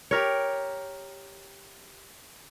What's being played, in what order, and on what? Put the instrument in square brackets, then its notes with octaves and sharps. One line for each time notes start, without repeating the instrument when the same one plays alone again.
[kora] G4 A#4 C#5